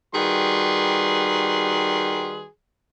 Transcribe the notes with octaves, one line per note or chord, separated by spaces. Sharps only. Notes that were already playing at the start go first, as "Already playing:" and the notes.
D#3 G3 F#4 G#4 B4 C6